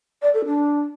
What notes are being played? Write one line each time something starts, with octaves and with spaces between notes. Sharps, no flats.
D5
A4
D4